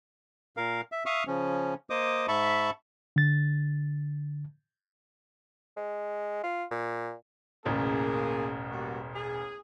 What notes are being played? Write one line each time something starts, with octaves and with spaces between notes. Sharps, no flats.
A#2 A#4 F5
E5
E5 F5 C#6 D#6 F6
C#3 F3 C#4
A#3 C5 D#5 D6 D#6
G#2 E5 A5 B5 C#6
D3 A6
G#3
F4
A#2
E1 A1 C#3 A#3 G#4
G3 A#3 F#4
G#4